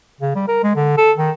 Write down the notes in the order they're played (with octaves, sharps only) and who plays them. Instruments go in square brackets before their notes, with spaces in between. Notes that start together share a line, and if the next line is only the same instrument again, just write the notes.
[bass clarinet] C#3
G3
A#4
G#3
D3
A4
D#3